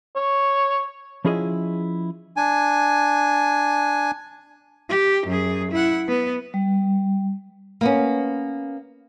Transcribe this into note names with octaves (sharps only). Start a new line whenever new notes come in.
C#5
F3 C#4 E4 F4 G#4 D#5
D4 G#5
G4
F#2 G#4
E4 F#5
B3
G3
A#3 B3 C#4